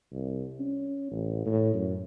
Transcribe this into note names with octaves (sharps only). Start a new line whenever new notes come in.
C2
C#4
A1
A2
F#2